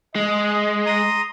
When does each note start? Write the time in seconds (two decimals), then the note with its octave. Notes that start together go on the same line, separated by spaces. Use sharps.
0.16 G#3 D#5
0.86 A#5 C6 D#6